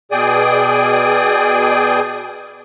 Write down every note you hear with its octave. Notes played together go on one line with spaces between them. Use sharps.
B2 G#4 D5 G5 G#5 D#6